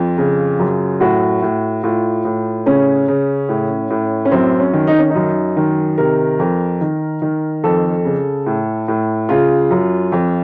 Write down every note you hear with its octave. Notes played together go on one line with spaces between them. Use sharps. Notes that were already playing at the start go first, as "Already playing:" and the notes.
Already playing: F2 F4
C#3
F#2
A2 F#4
A2
A2 F4
A2
C#3 C#4
C#3
A2
A2
C#4
F#2 C4
C#4
D#3
D#4
C#4
D#4
F#2
D#3
C3 A#4
F2
D#3
D#3
F2 A4
C#3
A2
A2
C#3 F4
F#2
F2